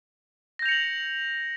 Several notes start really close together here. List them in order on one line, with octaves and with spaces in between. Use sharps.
A#6 G6 F7 C#7 F#7